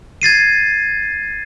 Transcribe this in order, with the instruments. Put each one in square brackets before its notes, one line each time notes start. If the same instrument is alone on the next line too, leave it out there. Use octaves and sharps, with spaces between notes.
[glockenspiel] G#6 A6 C7 D#7